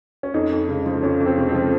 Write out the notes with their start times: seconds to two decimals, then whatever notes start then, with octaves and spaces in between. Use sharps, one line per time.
0.23 C#4
0.34 F2 D#4
0.51 F2
0.69 C#3
0.86 F3
1.03 F2 C#4
1.20 F2
1.26 C4
1.38 C#3
1.49 C4
1.54 F3